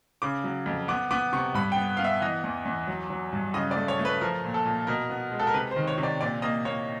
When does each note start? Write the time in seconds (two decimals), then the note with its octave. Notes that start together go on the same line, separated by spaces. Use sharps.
0.22 C#3 D6
0.44 F#3
0.66 F2
0.88 B3 D6
1.11 B3 D6
1.33 C3 C#6
1.54 G2 B5
1.72 G5
1.76 B3
1.97 B3 F5
2.04 E5
2.21 E3 D#5
2.44 E2
2.65 E2
2.87 F#3
3.10 F#3
3.33 G2
3.54 C#3 D#5
3.71 D5
3.76 A3
3.88 C#5
3.99 A3
4.05 B4
4.21 F3 A#4
4.44 A#2
4.54 A4
4.65 A#2
4.87 B2 A#4
5.10 B3
5.32 G#3
5.40 A4
5.47 A#4
5.54 C3 B4
5.71 C5
5.76 D#3
5.87 C#5
5.98 C3
6.03 D5
6.20 A#2 D5
6.42 A#3 D#5
6.65 A#3 C#5